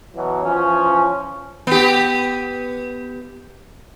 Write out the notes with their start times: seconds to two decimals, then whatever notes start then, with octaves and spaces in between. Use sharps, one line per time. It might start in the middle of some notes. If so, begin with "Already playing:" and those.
0.14 B2 E3 F#3
0.43 E3 F3 C#4
1.67 B3 G4